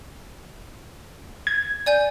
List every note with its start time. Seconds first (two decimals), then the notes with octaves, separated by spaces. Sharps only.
1.47 G#6
1.86 D5 G#5 G6